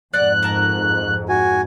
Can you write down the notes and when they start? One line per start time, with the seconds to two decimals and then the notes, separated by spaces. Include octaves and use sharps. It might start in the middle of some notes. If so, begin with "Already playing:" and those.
0.13 F2 G#2 D5 F#5 F#6
0.43 A#4 A5 A#5
1.29 F#4 G#5